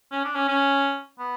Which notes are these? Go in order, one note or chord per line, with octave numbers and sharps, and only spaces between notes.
C#4
D4
C#4
C#4
B3